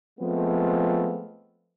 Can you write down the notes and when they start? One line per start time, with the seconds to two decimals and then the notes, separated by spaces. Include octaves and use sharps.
0.20 F3 G#3 A3 B3 C4 F4